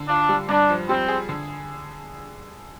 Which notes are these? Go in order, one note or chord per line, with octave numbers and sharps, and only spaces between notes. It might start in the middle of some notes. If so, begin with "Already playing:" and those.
Already playing: D3
D4 F4
G3
G2 D4
F3
G3 C4
G#4
D3